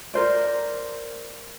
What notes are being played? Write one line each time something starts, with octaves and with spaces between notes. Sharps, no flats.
A#4 C5 D5